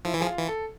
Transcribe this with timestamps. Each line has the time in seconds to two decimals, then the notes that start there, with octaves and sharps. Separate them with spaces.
0.05 F3 E4
0.14 E3
0.20 F3 G#4
0.27 F4
0.38 E3
0.48 A4